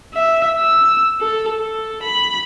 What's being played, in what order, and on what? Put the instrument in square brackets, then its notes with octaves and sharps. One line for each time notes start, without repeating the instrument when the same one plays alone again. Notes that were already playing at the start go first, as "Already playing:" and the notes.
[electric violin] E5
E6
A4
A4
B5